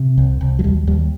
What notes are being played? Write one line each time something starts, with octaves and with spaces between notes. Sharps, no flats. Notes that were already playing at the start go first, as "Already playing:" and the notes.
Already playing: C3
C2
C2
F#3
D#2 G3
D#2 G3